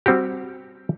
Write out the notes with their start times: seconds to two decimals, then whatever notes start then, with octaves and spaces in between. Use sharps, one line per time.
0.06 G3 C4 F#4 G4